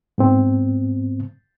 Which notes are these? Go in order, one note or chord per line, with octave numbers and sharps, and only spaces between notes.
G#2 B3 C4